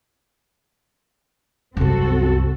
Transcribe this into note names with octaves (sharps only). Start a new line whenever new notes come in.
C2 F#2 C4 F#4 A4